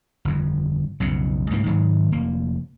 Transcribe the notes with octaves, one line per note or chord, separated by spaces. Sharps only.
G1 F2
B1 F2 C#3
D2 G#2 A3 A#3
G#2 D#3 F#3 G#3
F1 A#3